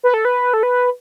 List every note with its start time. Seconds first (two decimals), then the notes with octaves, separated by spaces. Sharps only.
0.03 B4
0.14 A4
0.25 B4
0.54 A4
0.63 B4